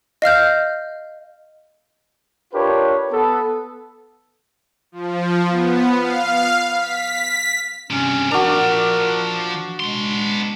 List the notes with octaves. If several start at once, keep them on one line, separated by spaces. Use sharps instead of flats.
D#5 F5 F6 G6
D4 F4 G4 A#4 B4 C#5
B3 A4
F3
B3
F5
B6
G2 C3 C#4
F3 D4 F#4 A#4 A#5
G#3 B3 C6